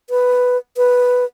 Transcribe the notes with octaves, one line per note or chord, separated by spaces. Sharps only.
B4
B4